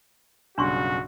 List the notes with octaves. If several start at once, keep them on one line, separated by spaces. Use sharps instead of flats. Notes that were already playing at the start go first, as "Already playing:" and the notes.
B1 G2 C#3 D4 F#4 C6 C#6